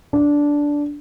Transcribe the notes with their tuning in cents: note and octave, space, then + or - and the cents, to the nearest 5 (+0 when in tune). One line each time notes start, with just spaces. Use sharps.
D4 -10